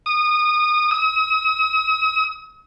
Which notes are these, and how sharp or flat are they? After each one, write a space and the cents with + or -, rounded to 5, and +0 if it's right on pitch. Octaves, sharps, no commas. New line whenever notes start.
D#6 -25
D#6 +45